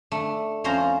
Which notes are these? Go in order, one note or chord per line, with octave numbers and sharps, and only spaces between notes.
A3 D4
F2 F3 C#4 C5 A#5